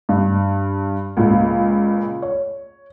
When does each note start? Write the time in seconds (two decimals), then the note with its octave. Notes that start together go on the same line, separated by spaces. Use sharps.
0.09 G2
1.17 C#2 A#2
2.22 C#5